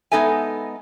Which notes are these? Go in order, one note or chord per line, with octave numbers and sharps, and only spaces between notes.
G#3 B3 D#4 A4 E5 G#5